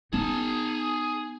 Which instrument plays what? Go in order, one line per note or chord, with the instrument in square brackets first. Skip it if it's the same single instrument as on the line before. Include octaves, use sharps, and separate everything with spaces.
[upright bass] B3 D#4 [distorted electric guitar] G#4 A5